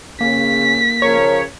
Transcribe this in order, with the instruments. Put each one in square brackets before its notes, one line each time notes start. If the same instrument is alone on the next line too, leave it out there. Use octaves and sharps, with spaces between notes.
[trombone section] C#3 C#4 [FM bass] A#3 [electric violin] B6
[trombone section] C#3 F3 A#4 [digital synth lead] C#5